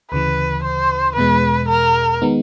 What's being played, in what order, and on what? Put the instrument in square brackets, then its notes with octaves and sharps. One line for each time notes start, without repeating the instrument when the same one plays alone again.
[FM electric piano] D2 C#3 E3 [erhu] B4
[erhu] C5
[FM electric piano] E2 B2 G#3 [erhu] B4
[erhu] A#4
[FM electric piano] D#3 G#3 B3 D#4